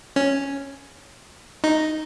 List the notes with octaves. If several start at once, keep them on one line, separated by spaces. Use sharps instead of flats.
C#4
D#4